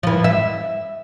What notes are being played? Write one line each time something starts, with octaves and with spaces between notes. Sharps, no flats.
E3 F3
E5